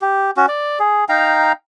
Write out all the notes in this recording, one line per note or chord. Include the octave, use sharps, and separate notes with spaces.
G4
C#4 F#4
D5
G#4
D#4 F5 G5 A#5